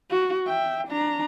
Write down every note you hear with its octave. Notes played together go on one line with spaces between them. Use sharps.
F#4
E5 G5
D4 A#5